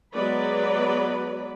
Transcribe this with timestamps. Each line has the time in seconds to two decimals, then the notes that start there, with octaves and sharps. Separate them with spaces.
0.13 F#3 G#3 B3 B4 D5 B5